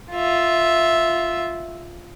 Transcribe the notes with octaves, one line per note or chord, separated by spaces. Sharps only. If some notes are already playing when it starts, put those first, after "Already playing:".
F4 E5